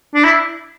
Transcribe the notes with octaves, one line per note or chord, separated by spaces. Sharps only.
D4
E4